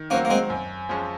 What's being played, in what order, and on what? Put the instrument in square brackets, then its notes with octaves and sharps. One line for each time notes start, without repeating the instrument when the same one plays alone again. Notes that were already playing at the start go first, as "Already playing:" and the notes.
Already playing: [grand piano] D#3
[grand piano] F#3 C4 F#4 [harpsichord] A#3 C#4
[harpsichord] A#3
G#3 C4
[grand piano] F#2
F3 G#3 C#4